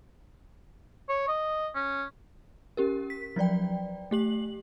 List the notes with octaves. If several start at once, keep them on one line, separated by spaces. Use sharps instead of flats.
C#5
D#5
C#4
C#4 G4 A#4
B6
F3 F#3 D5 G5
A3 G4 F#7